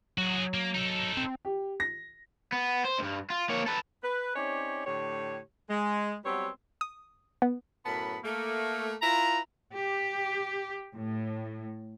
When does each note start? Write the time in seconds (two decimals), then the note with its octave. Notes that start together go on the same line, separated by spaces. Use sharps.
0.18 F#3 F#4 G#4
0.54 A#3
0.74 D#4 A4
1.17 C4
1.45 G4
1.80 A#6
2.52 B3
2.85 C5
2.99 C#2 G2
3.30 F4
3.49 A#3 C#5
3.67 A4 B4
4.03 B4
4.36 C4 C#4 D#4 G4 C#5 D5
4.86 A2 D3 G4 C#5
5.70 G#3
6.26 F#3 G3 B3 C4 B4 C#5
6.81 D#6
7.42 B3
7.84 F#2 A2 B3 A5 B5
8.24 A3 A#3
9.02 E4 F4 B4 A#5
9.73 G4
10.95 A2